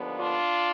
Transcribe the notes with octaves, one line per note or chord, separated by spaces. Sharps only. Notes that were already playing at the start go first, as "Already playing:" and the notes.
Already playing: D#2 D3 F3 B3
D4 F4